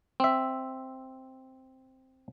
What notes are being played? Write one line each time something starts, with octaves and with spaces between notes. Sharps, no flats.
C4 E5